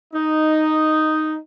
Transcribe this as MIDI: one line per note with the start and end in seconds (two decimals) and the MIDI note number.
0.14 1.36 63